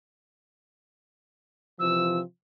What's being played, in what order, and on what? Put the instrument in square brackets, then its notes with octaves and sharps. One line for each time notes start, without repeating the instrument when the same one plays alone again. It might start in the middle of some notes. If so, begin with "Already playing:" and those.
[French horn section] C3 E3 F3 [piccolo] E6